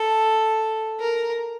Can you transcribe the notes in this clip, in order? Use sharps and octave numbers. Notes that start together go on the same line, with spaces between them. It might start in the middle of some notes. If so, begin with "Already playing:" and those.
Already playing: A4
A#4